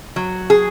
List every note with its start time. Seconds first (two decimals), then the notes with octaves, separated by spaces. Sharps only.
0.16 F#3
0.50 G#4